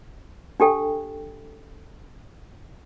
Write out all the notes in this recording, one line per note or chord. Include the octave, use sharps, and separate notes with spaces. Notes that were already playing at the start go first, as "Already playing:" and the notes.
D4 G4 A4 G5